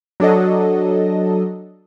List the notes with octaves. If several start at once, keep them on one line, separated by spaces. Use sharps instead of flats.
F#3 D4 A4 D#5